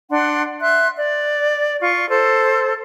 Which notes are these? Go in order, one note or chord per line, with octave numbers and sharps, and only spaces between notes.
D4 F#5 C6
E5 C6 F#6
D5
F4 C#6
A4 C5